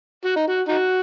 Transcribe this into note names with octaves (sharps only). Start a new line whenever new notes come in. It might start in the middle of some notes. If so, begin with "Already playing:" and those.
F#4
D#4
F#4
D#4 F#4